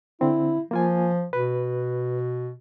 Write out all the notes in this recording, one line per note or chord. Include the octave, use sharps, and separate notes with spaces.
D3 C4 E4
F3 A#3 F4 G#5
B2 B4